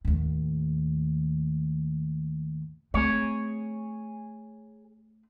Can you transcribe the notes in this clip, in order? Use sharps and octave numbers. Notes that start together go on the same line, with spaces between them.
D#2 A2
A3 C4 G#4 C#5